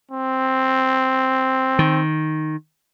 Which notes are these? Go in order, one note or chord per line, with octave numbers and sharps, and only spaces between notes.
C4
D#3